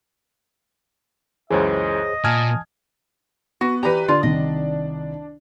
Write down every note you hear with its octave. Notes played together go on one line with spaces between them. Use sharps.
C#2 F#2 E3 G#4 C5 C#5 D#5
A#2 G#5 A5 D#6 F6 G#6
B3 F#4
E3 G4 B4 D5 A#5
D3 D4 F4
C2 D#3 D#5